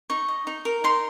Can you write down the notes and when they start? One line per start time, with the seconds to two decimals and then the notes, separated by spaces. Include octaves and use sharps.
0.10 D#4 C#6
0.28 D#5
0.47 D#4
0.65 A#4
0.84 D#4 C6